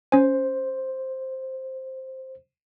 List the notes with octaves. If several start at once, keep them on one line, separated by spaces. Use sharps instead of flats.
C#4 C5 G#5